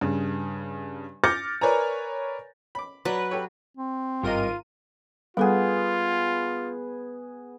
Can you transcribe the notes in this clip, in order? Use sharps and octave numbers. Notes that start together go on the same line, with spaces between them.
G2 C#3
D6 F6 G6 A6 A#6 C#7
A#4 B4 C#5 D5 G#5 A#5
B5 D6
F#3 B4 D5
G4 A4 C#5
C4
G#1 G2 F4 A#4 D#5 D#7
G3 B3 F4 G#4 A4 F#5